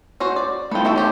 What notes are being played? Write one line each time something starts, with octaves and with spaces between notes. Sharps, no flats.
C#4 F#4 C5
D5
A3 D#4 F4 B4 G5
E4 F#4 A4
C#4 G4 C5